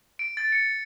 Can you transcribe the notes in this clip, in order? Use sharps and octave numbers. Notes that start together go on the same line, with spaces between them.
D7
A6
C#7